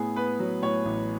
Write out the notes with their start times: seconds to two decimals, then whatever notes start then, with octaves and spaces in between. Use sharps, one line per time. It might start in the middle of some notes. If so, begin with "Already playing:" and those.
Already playing: A2 B3 G#4
0.16 B3 B4
0.40 F#3
0.62 A2 C#5
0.85 A1